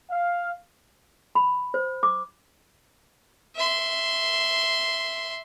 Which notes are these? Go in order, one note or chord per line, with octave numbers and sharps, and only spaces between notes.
F5
B5
C5
D6
E5 C6